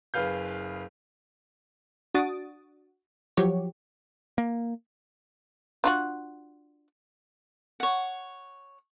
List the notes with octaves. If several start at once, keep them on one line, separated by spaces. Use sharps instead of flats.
F#1 G#4 B4 F5 G6
D4 F#4 D#6 A6 D7
F3 F#3 F#4 G4 C#5
A#3
D4 F4 F#4
C#5 F#5